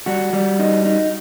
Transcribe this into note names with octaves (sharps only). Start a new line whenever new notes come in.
G3 F#4
G3
D#4
D#4